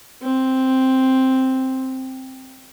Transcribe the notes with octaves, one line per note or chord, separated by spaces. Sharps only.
C4